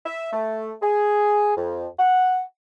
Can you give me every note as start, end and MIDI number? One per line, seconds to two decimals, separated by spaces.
0.06 0.29 76
0.32 0.72 57
0.82 1.53 68
1.56 1.86 41
1.99 2.42 78